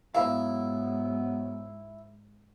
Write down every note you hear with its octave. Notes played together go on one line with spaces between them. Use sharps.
G#2 F#3 B3 E4 B4 E5 F5